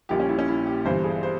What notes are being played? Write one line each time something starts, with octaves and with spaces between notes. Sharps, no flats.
A#1 A#2 G3 G4
C#4
E4
C#4
E4
G4
G1 G2 E3 G3 C5
G#4
C5